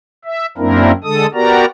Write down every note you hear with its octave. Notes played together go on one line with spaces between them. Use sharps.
E5
F#2 A#3 C4 D4 E4 A#4
D3 G#3 A4 D#6
B3 F#4 G4 A#4 D5 A#5